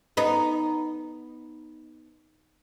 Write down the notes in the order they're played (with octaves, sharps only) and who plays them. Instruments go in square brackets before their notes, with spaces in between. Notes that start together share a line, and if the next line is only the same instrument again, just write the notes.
[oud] B3 D#4